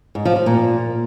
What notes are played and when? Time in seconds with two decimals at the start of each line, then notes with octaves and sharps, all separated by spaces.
0.15 G#2
0.25 F3
0.36 F3
0.46 A#2